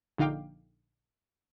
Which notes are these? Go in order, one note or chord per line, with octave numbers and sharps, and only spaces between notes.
A#1 D3 D#4 F5 G5 D6